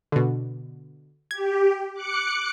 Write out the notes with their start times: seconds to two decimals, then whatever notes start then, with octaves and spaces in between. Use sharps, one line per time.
0.12 B2 D3
1.31 G4 G#6
1.93 D6 F#6 C#7